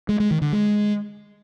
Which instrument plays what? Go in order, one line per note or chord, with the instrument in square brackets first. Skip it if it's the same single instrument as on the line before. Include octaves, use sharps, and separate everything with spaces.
[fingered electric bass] G#3
G#3
D#3
D3
G#3